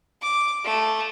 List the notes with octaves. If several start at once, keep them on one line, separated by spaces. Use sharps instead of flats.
D6
A3